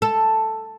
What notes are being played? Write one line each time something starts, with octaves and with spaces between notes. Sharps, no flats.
A4